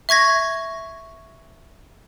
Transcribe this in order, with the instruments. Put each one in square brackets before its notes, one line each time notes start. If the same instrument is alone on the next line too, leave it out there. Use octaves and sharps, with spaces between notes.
[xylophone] E5 C#6 G#6 A#6